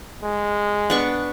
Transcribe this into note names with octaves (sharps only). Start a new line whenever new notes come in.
G#3
B3 D4 C#6